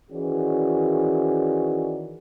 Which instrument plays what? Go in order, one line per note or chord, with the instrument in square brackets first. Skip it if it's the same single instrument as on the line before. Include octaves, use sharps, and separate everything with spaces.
[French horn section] D#3 E3 C#4 F#4 G#4 D5